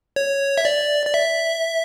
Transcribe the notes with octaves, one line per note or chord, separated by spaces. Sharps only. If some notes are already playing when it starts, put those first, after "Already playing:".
C#5
E5
D5
D5
E5